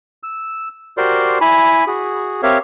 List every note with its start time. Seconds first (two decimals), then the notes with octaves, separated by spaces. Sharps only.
0.23 E6
0.97 F#4 G4 A#4 C5 D5 C6
1.41 E4 G#5 B5
1.87 F#4 G#4
2.43 C4 G4 A#4 C#5 E5 F5